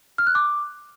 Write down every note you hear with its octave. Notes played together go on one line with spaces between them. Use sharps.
F6
F#6
D6